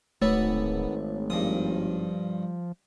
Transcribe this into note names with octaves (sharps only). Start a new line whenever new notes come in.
D1 G#1 A3 B3 C#5
G2 F3 D#6